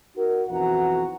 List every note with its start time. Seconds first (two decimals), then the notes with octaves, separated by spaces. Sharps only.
0.16 D#4 F#4 A#4
0.49 B1 F2 E3 F#4 F#5 A#5